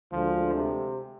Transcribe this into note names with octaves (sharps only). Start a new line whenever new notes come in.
D2 D3 F3 G#3
C3